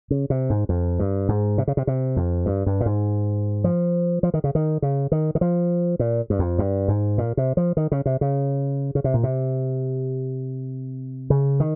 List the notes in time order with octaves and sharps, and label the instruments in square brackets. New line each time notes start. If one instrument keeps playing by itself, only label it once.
[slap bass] C#3
C3
G#2
F2
G2
G#2
C3
C#3
C3
C3
F2
G2
G2
A#2
G#2
F3
F3
D#3
C#3
D#3
C#3
D#3
D#3
F3
A#2
G2
F2
G2
G#2
A#2
C3
F3
D#3
C#3
C3
C#3
C#3
C3
A#2
C3
C#3
D#3